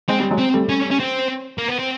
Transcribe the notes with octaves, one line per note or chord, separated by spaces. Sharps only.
G#3 C4
G3
F#3 G#3
C4
G3 A3
C#4
C#4
C4
A#3
B3
C4